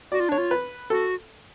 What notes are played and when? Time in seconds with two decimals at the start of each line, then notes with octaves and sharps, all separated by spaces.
0.12 F#4 D5
0.20 F4
0.29 D4 C#5
0.38 F4
0.51 B4
0.90 F#4 A4